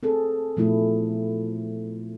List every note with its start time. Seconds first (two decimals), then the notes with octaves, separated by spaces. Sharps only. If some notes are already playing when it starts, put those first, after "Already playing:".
0.03 C4 G#4 A4
0.57 A#2 F3 A3 B3 E4 A4